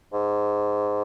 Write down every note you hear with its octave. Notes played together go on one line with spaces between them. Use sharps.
G#2